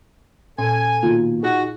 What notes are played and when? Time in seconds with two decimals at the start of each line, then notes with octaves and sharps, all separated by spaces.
0.59 A#2 C#4 A4 G#5
1.03 B2 D#3 A#3 F4
1.43 D#4 F#4 G#4